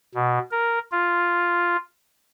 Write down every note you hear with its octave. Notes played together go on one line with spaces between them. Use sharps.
B2
A#4
F4